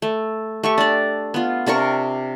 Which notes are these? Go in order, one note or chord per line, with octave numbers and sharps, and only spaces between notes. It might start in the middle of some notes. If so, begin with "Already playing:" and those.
A3
A3 G4 C#6
D4 D5
B3 F4
C3 D4 A#4 C#6